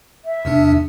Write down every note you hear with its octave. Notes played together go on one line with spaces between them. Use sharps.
E5
E2 C3 D4